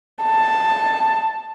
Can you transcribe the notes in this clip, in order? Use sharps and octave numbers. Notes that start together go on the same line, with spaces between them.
A5